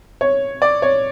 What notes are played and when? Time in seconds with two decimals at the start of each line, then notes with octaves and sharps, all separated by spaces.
0.21 C#5
0.62 D5
0.82 C#5